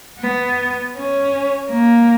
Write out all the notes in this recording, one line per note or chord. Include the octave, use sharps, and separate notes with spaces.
B3
C#4
A#3